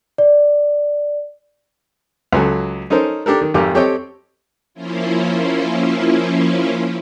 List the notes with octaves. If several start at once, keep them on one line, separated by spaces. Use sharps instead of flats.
D5
C#2 F#3 A4
C#4 D#4 A4 A#4 C5
D4 G4 A4 A#4
D#3
G#1 F2 G4 A#4 D6
C4 G4 A4 C#5 D#5 G5
F3 A#3 C#4 E4 F4